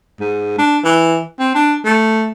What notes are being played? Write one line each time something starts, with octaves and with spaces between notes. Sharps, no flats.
G#2
D4
E3
C4
D4
A3